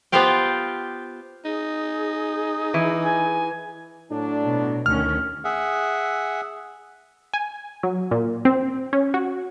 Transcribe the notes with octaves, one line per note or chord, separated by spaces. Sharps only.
B3 F4 G4 C5 F5 G5
D#4 G#4
E3
G#5
A2 F#3 D4
B2
D2 D#3 C#4 F6
G#4 E5 F#5
G#5
F#3
A#2
C4
C#4
F#4